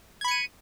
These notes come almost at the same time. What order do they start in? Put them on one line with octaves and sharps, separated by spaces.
G#6 B5 C#7 D#7